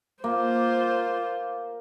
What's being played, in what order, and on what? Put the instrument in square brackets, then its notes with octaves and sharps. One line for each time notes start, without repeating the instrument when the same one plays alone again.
[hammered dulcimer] A#3 [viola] F4 C5